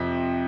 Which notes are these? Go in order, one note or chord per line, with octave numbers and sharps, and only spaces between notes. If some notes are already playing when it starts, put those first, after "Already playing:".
Already playing: F2 C3 F3 B6